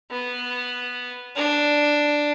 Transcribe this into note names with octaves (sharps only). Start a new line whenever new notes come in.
B3
D4